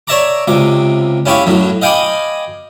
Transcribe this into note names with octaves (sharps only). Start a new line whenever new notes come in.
C#5 D5 E5 A5 A#5 D6
C#2 C3 D6
C#4 E4 G4 C#5 F5
F#2 A2 F#3
D#5 F5 G5 G#5 B5 D6